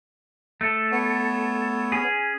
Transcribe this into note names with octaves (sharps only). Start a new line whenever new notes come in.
A3 A4
B3 C#5
C#4 G#4